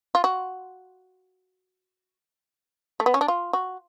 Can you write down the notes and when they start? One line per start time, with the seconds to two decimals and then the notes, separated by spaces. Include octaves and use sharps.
0.15 F4
0.24 F#4
3.00 A3
3.06 B3
3.14 C#4
3.21 D4
3.28 F4
3.53 F#4